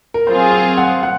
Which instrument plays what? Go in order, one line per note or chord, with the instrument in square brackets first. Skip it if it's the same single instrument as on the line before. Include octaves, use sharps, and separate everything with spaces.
[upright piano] A#4
[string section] F#3 C4 F4 G#4 [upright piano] C5
[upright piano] F5
F#5
F#5